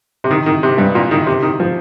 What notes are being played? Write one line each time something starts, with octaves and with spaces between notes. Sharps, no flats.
C3
D#3
D#3
C3
G2
A#2
D#3
C3
D#3
F3